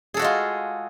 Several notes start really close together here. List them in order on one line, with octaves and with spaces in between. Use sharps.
G#4 A4 F#4 G#3 F4